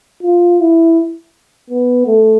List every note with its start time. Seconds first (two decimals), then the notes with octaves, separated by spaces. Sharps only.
0.23 F4
0.61 E4
1.70 B3
2.06 A3